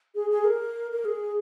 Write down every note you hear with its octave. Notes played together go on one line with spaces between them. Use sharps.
G#4
G#4
A#4
A#4
G#4